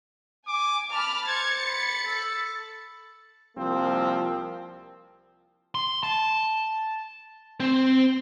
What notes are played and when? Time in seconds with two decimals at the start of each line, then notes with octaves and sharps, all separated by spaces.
0.47 G#5 D6
0.92 A5 B5 D6 F6
1.27 C5 G#6 A6 C#7
1.66 B5
2.07 A4
3.57 C2 F3 A#3 C4
5.75 C6
6.03 A5
7.60 C4 C5